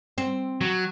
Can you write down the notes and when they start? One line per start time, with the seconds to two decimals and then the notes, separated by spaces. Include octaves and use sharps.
0.18 C4
0.61 F#3